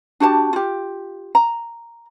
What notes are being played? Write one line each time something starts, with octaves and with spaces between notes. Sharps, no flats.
D4 F#4 G4 A5
F4 G4
A#5